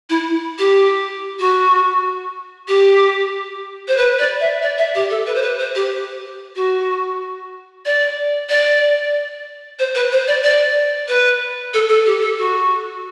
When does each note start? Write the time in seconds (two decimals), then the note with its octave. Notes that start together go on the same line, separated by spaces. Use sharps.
0.09 E4
0.58 G4
1.39 F#4
2.68 G4
3.87 C5
3.97 B4
4.19 D5
4.40 E5
4.62 D5
4.78 E5
4.94 G4
5.10 A4
5.26 B4
5.34 C5
5.42 B4
5.59 C5
5.75 G4
6.55 F#4
7.85 D5
8.49 D5
9.79 C5
9.94 B4
10.12 C5
10.27 D5
10.43 D5
11.08 B4
11.73 A4
11.88 A4
12.05 G4
12.21 A4
12.37 F#4